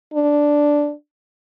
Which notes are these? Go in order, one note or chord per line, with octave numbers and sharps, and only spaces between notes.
D4